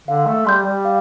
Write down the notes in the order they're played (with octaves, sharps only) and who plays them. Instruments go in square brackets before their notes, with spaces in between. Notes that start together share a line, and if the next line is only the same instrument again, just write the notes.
[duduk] D3 [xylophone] F5
[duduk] A3
[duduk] G3 [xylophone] C6 G6
[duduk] G3
[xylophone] F5